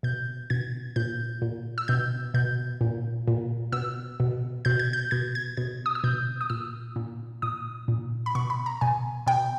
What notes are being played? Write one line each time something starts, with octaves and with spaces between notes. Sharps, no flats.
B2 G6
B2 G#6
A#2 G6
A#2
E6
B2 G6
B2 G6
A#2
A#2
B2 E6
B2
B2 G6
G#6
G6
B2 G#6
G#6
B2 G#6
D#6
E6
B2 G6
D#6
A#2 E6
A#2
A#2 D#6
A#2
B5
B2 C#6
B5
A#5
B2 G#5
B2 G5